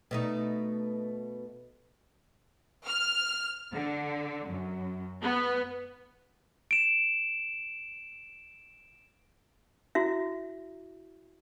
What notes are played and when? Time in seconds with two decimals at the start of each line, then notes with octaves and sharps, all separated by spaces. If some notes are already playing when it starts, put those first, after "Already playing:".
0.11 B2 A3 D#4
2.85 F6
3.72 D3
4.46 F#2
5.22 B3
6.71 D7 E7
9.95 E4 F#4 E5